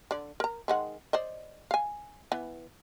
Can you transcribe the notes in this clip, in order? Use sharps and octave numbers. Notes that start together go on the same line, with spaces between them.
D3 D5
A#4 A#5
D#3 G#3 F#5
C5 D5 D#5
F5 G#5
E3 B3